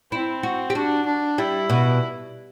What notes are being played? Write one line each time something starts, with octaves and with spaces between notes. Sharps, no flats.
C4 E4
F#4
G4
D4 F#4
D4
G3 E4
B2